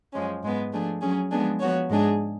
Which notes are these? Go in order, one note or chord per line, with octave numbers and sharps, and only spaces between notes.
F#2 F3 G#3 C#4
G#2 G#3 B3
F3 A3 D4 G#4
F#3 C#4 G#4
F3 G#3 B3 D4 G#4
F3 B3 F#4 C#5
G#2 G#3 D4 G#4